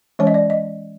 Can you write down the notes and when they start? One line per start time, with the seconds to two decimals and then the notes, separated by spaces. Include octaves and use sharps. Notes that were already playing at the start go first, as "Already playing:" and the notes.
0.19 E3 G#3 C#4 C#5
0.27 D#5
0.34 D5
0.50 D#5